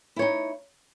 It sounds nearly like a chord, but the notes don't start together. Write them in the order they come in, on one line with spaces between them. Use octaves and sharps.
E4 C#5 D#4